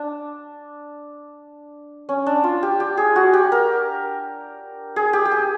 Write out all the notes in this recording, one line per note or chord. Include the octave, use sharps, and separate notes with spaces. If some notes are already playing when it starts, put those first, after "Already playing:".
Already playing: D4
C#4
D4
F4
G4
G4
G#4
F#4
G4
A#4
G#4
G4
G4
G#4